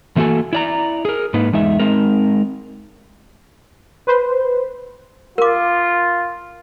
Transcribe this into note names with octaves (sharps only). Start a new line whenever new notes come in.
E3 A3 A#3 F#4 A4 G#5
E4 D5 A#5
G#4 A#4
G#2 A#3 D#4 B4
E2 G#3 D#4 E5
G#3 C4 D#4 A#4
B4 C5
F4 A#4 D6